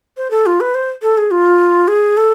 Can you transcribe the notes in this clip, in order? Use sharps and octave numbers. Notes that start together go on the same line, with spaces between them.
C5
A4
F4
B4
C5
A4
G#4
F4
G#4
A4